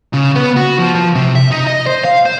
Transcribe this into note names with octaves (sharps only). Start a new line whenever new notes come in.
C#3
B3
F#4
F3
F3
C3
E5
D#4
D#5
C5
F5
C5